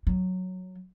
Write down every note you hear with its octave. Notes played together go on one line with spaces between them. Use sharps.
F#3